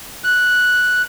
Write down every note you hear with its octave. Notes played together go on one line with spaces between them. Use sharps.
F#6